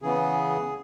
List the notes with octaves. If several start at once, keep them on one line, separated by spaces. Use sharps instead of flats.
C#3 E3 B3 G#4